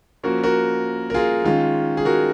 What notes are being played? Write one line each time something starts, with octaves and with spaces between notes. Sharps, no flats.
F3 A#3 C#4 F#4 A#4
F#4 A#4
A#4
F4 G#4
D#3 G#3 C#4 F4
G#4
F#4 A#4